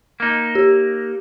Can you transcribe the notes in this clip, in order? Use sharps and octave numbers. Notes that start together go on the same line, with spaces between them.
A#3 D#4
G4